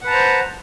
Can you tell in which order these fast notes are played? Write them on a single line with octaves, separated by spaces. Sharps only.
F#5 B4 A5 A#5 C5